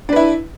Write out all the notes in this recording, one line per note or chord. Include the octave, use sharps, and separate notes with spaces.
D4 E4 B4